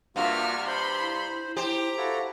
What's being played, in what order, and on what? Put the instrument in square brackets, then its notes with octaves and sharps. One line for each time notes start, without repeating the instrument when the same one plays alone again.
[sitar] G2 C3 [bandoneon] A#3 F4 F#4 [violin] E5 F6
[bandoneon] C5 [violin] B5 C6
[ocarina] E4
[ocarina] E4 [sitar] G4 C5 [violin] A#5
[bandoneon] E4 F#4 A4 [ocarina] F5